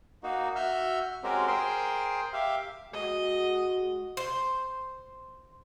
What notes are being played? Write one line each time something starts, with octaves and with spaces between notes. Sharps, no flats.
A#3 D#4 F#4
F#4 E5 E6 F6 G6
G#3 C4 C#4 F#4 G4 A#4
G#4 A#4 C5 G5 C6
G4 E5 F5
G#3 F#4 D#5
C5